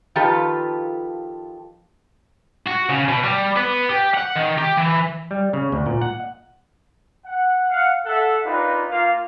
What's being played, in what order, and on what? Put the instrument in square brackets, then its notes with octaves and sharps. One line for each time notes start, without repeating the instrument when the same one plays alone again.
[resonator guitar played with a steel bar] D#3 F3 F4 G4 A4 B4
[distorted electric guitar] F#4
C#3
B2
G3
B3
G4
F#5
D#3
G4
E3
[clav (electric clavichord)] G3
C#3
D2
A#2
F#5
[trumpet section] F#5
F5 F#5
A4 E5 F#5
D4 D#4 F4 G4 A#4 B4
A#3 F4 F5